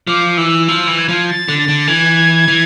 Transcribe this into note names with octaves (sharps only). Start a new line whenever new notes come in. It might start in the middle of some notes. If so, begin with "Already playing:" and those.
F3 D6
E3 E6
F3 E6
E3
G#6
F3
A6
D3
A6
D3
E3 G#6
E3